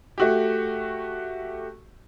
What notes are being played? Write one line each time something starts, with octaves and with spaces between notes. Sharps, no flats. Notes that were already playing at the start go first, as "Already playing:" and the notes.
A3 F#4 G4